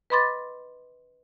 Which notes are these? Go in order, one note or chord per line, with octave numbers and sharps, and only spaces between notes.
B4 D#5 B5 C6 D6 A6